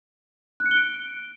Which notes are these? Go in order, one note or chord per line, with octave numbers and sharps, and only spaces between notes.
F#6
C#7
G7
D7